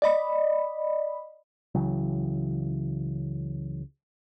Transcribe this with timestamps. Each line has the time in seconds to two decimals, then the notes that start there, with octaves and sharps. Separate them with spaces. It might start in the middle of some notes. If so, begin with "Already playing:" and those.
0.02 D5 D#5 B5
1.75 C#2 C#3 E3 F#3